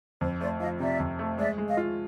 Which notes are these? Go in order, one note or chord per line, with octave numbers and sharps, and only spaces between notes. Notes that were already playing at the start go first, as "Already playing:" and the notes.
F2 C5
A3 C5 D5
F3 D#5 F5
C3 D5 E5
F2
A3
G#3 D5 E5
G#3
D#5 F5
F4